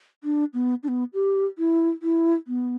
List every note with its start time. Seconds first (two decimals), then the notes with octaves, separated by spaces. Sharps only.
0.24 D4
0.54 B3
0.83 D4
0.88 B3
1.14 G4
1.58 E4
2.02 E4
2.47 B3